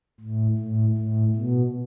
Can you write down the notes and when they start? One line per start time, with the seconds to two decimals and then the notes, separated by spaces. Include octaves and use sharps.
0.20 A2
0.58 A2
0.97 A2
1.36 B2